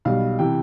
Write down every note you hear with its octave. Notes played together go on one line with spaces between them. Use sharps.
B1 B2 G3 F5
C3 E3 G5